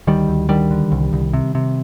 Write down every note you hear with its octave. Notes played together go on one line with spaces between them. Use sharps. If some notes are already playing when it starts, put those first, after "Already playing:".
D2 D#3 G3
D2
D3 D#3 G3
D3
C2
C2
C3
C3